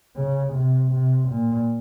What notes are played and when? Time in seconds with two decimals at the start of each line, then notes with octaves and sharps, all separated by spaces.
0.16 C#3
0.53 C3
0.91 C3
1.29 A#2